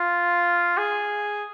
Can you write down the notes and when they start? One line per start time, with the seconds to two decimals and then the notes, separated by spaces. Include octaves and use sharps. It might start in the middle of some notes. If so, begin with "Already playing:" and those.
Already playing: F4
0.78 G#4